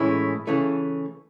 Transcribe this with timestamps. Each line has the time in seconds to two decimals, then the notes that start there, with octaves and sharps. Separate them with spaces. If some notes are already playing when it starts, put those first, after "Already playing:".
Already playing: A2 E3 G#3 C#4 E4
0.47 C#3 E3 A3